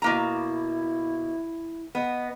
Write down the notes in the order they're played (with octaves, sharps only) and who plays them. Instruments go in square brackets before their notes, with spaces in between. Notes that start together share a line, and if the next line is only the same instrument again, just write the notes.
[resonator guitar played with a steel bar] B2 A#3 A#5 [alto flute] E4
[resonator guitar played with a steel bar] B3 [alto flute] D#5